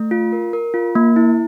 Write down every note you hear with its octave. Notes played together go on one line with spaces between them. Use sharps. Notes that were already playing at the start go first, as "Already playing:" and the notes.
Already playing: A3
F4
A#4
A#4
F4
A#3
E4